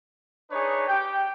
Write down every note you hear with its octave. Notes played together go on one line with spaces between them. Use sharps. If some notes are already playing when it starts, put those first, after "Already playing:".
D4 D#4 G#4 B4 C#5
G4 G5